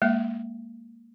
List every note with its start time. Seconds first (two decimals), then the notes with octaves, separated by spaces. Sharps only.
0.02 G#3 A#3 E5